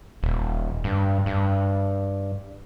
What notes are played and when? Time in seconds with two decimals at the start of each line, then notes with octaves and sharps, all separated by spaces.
0.23 D#1
0.84 G2
1.26 G2